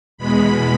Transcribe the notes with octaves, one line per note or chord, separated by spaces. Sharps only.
E2 B2 G#3 B5